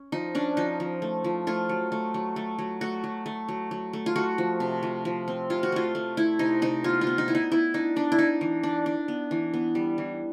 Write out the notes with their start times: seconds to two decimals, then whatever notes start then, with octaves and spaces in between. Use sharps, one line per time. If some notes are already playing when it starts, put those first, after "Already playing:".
Already playing: C#4
0.12 F3 D#4
0.35 C#4 D4
0.57 F3 D#4
0.80 F3
1.02 A3
1.24 F3
1.47 A3 F4
1.69 F#3
1.92 A3
2.14 F#3
2.36 A3
2.59 F#3
2.81 A3 F#4
3.04 F#3
3.26 A3
3.49 F#3
3.71 F#3
3.93 A3
4.06 F4
4.16 A3 F#4
4.38 F3
4.60 C3
4.83 F3
5.05 F3
5.28 C4
5.50 C3 F4
5.63 F#4
5.72 A3 F4
5.95 A3
6.17 A3 E4
6.39 C3 D#4
6.62 C3 D#4
6.84 B3 F4
7.01 F4
7.07 B3
7.18 D#4
7.28 B3 E4
7.35 D#4
7.52 B3 E4
7.74 D4 D#4
7.96 B3 D4
8.12 E4
8.18 D4 D#4
8.41 E3
8.63 D4
8.86 D4
9.08 B3
9.31 E3
9.53 B3
9.75 G3
9.98 E3